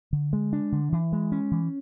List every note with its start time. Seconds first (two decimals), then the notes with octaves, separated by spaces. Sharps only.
0.13 D3
0.33 G#3
0.53 D4
0.72 D3
0.92 E3
1.13 G#3
1.32 C#4
1.51 E3